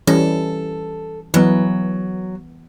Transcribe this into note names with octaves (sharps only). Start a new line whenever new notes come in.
E3 G3 C#4 A4
E3 F#3 B3